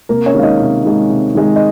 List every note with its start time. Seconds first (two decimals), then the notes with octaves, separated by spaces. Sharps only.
0.09 C3 A#3 A#4
0.26 C#4 C#5
0.34 D#3 G#3 F5
0.43 D#4 D#5
0.60 C3
0.85 D#3 G#3
1.10 C3
1.35 D#3 G#3
1.56 D#5